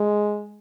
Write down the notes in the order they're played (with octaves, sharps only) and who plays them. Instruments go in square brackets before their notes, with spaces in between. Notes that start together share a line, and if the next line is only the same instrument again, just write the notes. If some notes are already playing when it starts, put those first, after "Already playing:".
Already playing: [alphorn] G#3